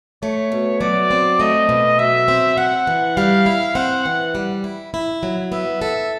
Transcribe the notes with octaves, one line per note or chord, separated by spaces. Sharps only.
A3 C#5
B2
F#3 D5
C4
A3 D#5
B2
F#3 E5
C4
C4 F#5
E3
G3 F5
E4
C4 F#5
E3
G3
E4
E4
F#3
B3 E5
A4 E5